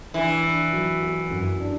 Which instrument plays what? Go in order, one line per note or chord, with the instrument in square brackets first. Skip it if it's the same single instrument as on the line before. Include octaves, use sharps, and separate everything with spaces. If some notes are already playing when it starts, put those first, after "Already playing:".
[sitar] E3 [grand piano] D4
[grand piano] D4
F#3
F#4
F#2
D4